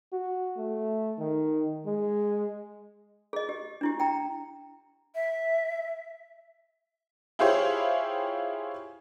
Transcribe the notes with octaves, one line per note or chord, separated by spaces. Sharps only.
F#4
A3
D#3
G#3
G#4 D#5
G4
D4 E4 G4
G5 A#5
E5
E4 F4 G4 G#4 C5 C#5